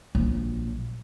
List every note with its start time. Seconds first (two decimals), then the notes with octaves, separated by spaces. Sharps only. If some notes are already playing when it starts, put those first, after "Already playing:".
0.15 A#1 F#3